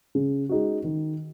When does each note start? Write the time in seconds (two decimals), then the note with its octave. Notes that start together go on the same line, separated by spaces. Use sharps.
0.15 C#3
0.49 G#3 D#4 F#4
0.84 D#3